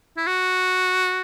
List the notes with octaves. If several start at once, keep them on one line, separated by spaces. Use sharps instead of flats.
E4
F#4